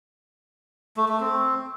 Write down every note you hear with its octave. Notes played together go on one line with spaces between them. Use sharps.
A3
A3
C4